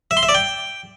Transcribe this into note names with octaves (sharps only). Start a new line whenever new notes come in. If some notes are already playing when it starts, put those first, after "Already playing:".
E5
C6
E5
D5
G5